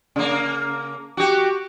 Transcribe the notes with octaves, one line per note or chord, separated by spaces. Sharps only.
C#3 A#3
F#4 G4